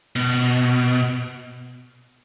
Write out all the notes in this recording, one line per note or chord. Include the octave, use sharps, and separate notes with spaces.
B2